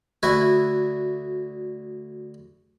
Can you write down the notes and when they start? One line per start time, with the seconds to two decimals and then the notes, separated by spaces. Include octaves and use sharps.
0.23 D2 E4 F#4 E5 G#5